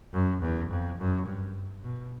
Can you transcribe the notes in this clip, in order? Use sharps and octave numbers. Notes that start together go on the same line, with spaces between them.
F#2
E2
F2
F#2
G2
B2